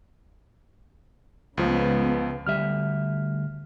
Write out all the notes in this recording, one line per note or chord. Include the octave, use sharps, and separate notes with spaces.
C#2 C#3 F3 G#3 B3
D2 G3 E5 F6